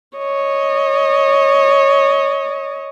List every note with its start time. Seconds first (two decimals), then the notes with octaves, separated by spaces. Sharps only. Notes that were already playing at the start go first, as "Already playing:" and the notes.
0.17 C#5 D#5